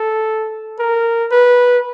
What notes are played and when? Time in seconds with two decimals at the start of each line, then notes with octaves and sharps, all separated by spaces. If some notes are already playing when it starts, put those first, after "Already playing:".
Already playing: A4
0.79 A#4
1.31 B4